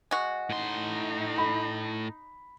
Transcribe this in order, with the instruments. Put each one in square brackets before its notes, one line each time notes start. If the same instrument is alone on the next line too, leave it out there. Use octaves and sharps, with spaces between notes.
[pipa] G#3 F#4
[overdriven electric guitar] A2 C6 [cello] D#4
[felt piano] B5